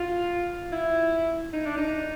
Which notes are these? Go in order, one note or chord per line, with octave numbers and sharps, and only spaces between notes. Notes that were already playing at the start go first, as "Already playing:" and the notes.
Already playing: F4
E4
D#4
D4
D#4